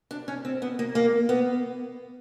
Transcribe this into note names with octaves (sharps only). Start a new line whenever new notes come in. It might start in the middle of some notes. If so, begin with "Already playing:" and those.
D4
C#4
C4
B3
A#3
A#3
B3